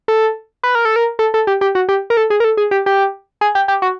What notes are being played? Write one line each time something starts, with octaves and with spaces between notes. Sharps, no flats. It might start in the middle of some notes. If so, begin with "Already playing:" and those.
A4
B4
A#4
A4
A#4
A4
A4
G4
G4
F#4
G4
A#4
A4
G#4
A#4
A4
G#4
G4
G4
G#4
G4
G4
F#4